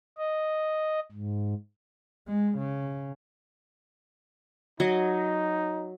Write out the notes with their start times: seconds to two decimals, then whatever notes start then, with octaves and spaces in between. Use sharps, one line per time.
0.18 D#5
1.12 G#2
2.27 G#3
2.58 C#3
4.80 F#3 D#4 D#5